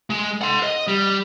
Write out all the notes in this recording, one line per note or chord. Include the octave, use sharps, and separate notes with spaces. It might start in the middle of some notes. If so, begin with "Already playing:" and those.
G#3
F#5 C6
D#5
G3